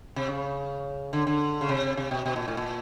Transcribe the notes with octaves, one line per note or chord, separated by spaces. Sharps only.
C3
C#3
D3
D3
C#3
C3
C3
B2
B2
A#2
A2
A#2